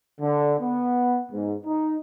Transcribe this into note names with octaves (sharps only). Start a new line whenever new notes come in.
D3
B3
G#2
D#4